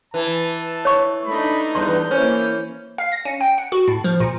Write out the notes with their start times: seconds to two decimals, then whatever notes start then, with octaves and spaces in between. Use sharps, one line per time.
0.14 E3 A5
0.85 C#5 C#6
1.26 A3 D4 D#4 B5
1.75 E2 G2 C6 G6
2.11 E3 A#3 C#4 C5
2.98 F5
3.12 A#6
3.25 C#4
3.41 G5
3.58 F#5
3.72 F#4
3.88 A2
4.04 F3
4.20 A#2